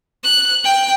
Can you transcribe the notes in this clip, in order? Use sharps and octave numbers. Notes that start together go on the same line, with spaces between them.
F#6
G5